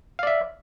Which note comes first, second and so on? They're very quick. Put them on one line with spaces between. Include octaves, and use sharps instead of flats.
F5 D5 E5